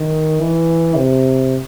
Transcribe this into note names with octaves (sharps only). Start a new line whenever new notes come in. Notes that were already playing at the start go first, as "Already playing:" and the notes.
Already playing: D#3
E3
C3